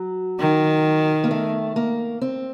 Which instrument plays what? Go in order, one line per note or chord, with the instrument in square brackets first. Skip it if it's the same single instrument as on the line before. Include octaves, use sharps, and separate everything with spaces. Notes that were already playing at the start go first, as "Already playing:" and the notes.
Already playing: [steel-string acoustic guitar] F#3
[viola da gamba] D#3
[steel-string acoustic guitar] A#3
A3
A#3
C4